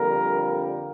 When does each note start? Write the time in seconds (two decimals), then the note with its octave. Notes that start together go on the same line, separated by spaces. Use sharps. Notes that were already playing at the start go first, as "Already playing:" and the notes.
Already playing: F2 D3 G3 A#3 A#4